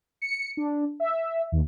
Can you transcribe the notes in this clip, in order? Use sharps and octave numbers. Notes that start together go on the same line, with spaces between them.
C#7
D4
E5
D#2